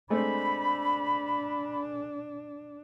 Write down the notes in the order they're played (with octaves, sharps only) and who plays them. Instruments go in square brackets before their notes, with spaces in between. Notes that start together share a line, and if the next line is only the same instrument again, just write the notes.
[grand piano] G#3 A3 C4 [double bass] D4 [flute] B5